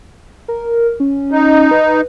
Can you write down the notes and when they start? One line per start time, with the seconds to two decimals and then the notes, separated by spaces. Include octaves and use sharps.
0.48 A#4
1.00 C#4
1.31 D#4
1.71 B4